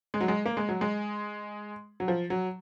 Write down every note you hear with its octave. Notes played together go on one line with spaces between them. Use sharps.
G#3
F#3
G#3
A#3
G#3
F#3
G#3
F#3
F3
F#3